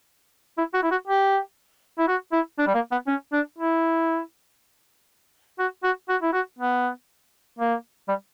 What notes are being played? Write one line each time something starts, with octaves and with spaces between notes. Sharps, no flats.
E4
F#4
E4
F#4
G4
E4
F#4
E4
D4
G3
A#3
B3
C#4
D4
E4
F#4
F#4
F#4
E4
F#4
B3
A#3
G3